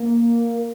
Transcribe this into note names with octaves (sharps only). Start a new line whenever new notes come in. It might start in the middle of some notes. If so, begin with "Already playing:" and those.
Already playing: A#3